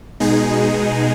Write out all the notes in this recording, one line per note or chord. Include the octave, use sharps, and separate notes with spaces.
B2 G#3 D#4 G#4